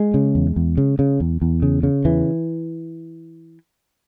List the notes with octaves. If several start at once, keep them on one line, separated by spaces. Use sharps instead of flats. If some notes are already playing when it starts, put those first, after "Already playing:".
Already playing: G#3
C#3
E2
E2
C#3
C#3
E2
E2
C#3
C#3
E2 E3